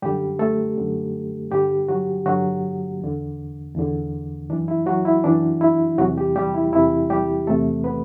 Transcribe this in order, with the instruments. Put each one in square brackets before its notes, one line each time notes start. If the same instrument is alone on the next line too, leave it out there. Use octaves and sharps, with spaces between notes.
[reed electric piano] F#2 D3 G3 G4
A3 A4
F#2 D3
G2 D3 G3 G4
F#3 F#4
G2 D3 F#3 F#4
E2 D3
E2 D3
F#2 E3 D4
E4
F#3 F#4
E4
F#2 E3 D4
E4
E2 C3 E3 F#3 F#4
G3 G4
G3 G4
E4
E2 C3 E3 E4
G3 G4
E2 C3 E3 A3 A4
B3 B4